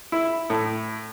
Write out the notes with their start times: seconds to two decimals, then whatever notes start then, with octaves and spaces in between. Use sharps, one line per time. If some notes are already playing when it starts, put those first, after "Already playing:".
0.12 E4
0.50 A2